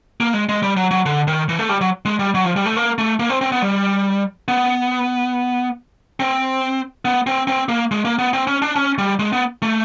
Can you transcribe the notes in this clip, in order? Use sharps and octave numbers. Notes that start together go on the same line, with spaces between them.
A#3
G#3
G#3
G3
F#3
F#3
D3
D#3
E3
A3
G3
F#3
G#3
G3
F#3
F3
G3
A3
A#3
A3
A#3
C4
C4
B3
G3
B3
C4
B3
C4
C4
A#3
G#3
A#3
B3
C4
C#4
D4
C#4
G3
G#3
B3
A3